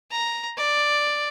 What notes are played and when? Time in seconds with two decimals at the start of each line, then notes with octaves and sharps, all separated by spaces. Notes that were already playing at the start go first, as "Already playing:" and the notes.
0.11 A#5
0.58 D5